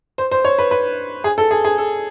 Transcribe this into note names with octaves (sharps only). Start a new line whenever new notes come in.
C5
C5
C#5
B4
B4
G#4
A4
G#4
G#4
A4